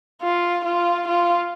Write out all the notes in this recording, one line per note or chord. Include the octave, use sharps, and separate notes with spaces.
F4
F4
F4